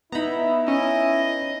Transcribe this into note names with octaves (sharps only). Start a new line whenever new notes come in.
B3 D#4 E4 A#5 B5
C#4 D#5